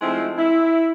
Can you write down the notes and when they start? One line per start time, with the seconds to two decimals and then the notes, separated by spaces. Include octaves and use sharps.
0.01 F3 G#3 A3 C4 D#4 E4
0.38 E4